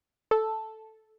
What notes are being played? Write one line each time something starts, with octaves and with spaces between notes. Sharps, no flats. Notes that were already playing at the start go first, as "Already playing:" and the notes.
A4